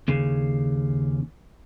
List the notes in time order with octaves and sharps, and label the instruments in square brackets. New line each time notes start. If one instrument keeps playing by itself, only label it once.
[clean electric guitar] D#2 C#3